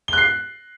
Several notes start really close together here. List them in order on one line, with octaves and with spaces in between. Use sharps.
G7 F#6 C7